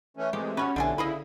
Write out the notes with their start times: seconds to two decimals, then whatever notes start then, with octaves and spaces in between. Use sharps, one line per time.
0.17 E3 A3 C#4
0.33 C3 E3 G#3 A3 G4
0.57 B3 C#4 F#4 B4 C#5
0.76 B1 A2 D3 E3 G3 A4 G#5
0.98 C#3 E4 D#5 F5 G#5 B5